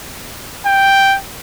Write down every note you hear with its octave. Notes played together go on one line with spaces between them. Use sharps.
G5